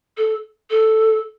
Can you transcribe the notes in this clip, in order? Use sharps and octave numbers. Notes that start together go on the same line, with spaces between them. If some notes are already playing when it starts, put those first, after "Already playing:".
A4
A4